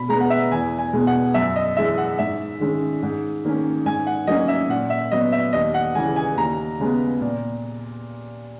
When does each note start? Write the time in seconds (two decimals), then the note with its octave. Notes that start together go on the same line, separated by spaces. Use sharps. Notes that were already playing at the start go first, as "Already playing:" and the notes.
Already playing: B2 B5
0.09 G#3 B3 A#5
0.21 F#5
0.30 E5
0.52 E2 G#5
0.79 G#5
0.93 B2 G#3 B3
1.07 F#5
1.34 F#2 E5
1.56 D#5
1.77 E3 G#3 E5
1.98 F#5
2.19 G#2 E5
2.60 D#3 G#3 C#4
3.03 G#2
3.45 D#3 A#3 C#4
3.85 G#2 G#5
4.07 F#5
4.27 F#3 A#3 C#4 D#5
4.48 E5
4.69 A#2 F#5
4.90 E5
5.12 F#3 B3 D#5
5.32 E5
5.53 D#2 D#5
5.74 F#5
5.95 C#3 E3 G#3 G#5
6.16 G#5
6.37 D#2 A#5
6.80 C#3 G#3 B3
7.21 A#2